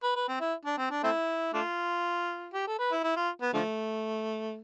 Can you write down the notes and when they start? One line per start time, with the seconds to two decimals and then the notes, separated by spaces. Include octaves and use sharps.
0.03 B4
0.16 B4
0.28 C4
0.40 E4
0.65 D4
0.78 C4
0.90 D4
1.03 A3 C4 E4
1.53 A3 D4 F4
2.54 G4
2.67 A4
2.79 B4
2.91 E4
3.03 E4
3.16 F4
3.41 B3
3.54 D3 F3 A3